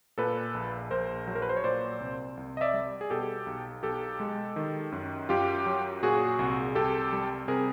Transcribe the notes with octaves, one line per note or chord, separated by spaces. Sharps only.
A#2 A4 B4
A#1
A#1 A#4 C5
F#3
A#4
B4
C5
C#5
A#2 C5 D5
C2
C2
D#5
D5 E5
G3
G#4
B2 G4 A4
B1
B1 G4 A4
G#3
D#3
F#2
F#2 F4 G4
F#3
A#2 F#4 G#4
C2
C2 G4 A4
G3
C3 G#4 A#4